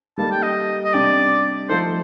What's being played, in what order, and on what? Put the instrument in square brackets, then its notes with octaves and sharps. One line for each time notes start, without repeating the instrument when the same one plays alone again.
[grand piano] G3 A#3 D#4 A4 [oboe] A5
[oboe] G5
D#5
D#5
[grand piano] C3 G3 D4 G4 [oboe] D5
[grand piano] F3 A3 D#4 A4 [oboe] C5